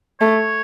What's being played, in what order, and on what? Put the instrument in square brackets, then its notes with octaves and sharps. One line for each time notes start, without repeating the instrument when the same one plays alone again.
[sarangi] A3 [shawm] C#5